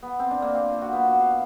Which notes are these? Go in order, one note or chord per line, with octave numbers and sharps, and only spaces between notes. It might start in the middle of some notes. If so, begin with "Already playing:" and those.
B3
C4
D4
A#3
C4
F4
F#4
B3
F#4
F5